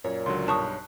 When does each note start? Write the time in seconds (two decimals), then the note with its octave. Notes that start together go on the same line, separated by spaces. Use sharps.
0.04 F#2 A#2 C#5
0.26 C#2 D3 F#3 C6
0.48 B1 G2 C#5 A5 C#6 D#6 F#6